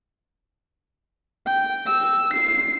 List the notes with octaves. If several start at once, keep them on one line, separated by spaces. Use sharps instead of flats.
G5
E6
C7